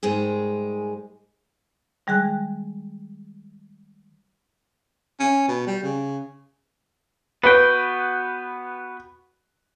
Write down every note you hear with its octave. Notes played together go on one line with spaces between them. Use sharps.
G#2 D#3 G3 G#3 G4 G#4
D#3 G3 G#3 G#4 G5 F#6
C#4
B2
G3
C#3
B3 F#4 B4 G5